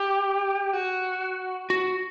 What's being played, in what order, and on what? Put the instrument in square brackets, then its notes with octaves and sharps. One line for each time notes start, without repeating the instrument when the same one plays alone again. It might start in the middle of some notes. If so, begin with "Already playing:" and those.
Already playing: [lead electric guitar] G4
F#4
F#4